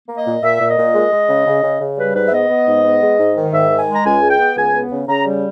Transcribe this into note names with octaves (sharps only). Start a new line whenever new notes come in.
A#3
D#5
A#2
A#2 E5
A#2
D#5
A#2
G#3
G#3
C#3
C#3
C#3
C#3
G3 B4
G#2 B4
E5
B3 D#5
B3
G#2
B3
G#3
G#2
D#3
G#2 E5
D#3
G#5
G#3
A#5
C#2 G#5
G#3
G5
B3
C#2 G#5
B3
C#3
C#3 A#5
G3